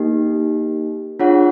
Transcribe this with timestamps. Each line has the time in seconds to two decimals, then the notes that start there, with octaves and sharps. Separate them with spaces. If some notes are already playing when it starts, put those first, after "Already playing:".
Already playing: A#3 D#4 G4
1.20 D4 F4 G#4 C#5 F#5